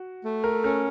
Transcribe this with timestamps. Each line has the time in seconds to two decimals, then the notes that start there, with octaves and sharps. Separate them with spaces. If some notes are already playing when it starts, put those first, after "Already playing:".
Already playing: F#4
0.25 A3
0.44 A#4
0.63 C#4 A#4